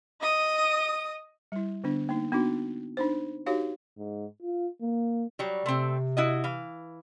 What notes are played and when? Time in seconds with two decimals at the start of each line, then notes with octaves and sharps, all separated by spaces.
0.21 D#5 D#6
1.52 G3 E4
1.84 D3 B3 D4
2.09 A#3 D#4
2.32 B3 D4 D#4 F#4
2.97 D4 D#4 C5
3.46 D#4 F#4 G4 C#5 F5
3.98 G#2
4.43 F4
4.82 A#3
5.39 F#3 G3
5.66 C3 A3 C4
6.17 E4 F#4 D#5
6.44 E3 F5